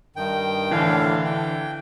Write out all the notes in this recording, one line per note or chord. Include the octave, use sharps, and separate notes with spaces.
G2 D#3 G5
A2 D3 E3 D4 F5
G5